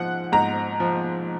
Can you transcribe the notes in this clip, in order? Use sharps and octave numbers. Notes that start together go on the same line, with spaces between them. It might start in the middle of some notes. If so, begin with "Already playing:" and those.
Already playing: G#2 F3 F#5
G#2 A#5
F3